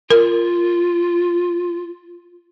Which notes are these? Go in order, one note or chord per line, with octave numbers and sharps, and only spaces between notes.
F4 A#4